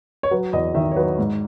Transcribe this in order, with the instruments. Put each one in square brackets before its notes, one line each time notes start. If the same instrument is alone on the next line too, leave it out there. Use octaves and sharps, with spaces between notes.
[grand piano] C#5
F#3 B4
E2 D#5
D#3 E5
C#5
F#3 B4
G#2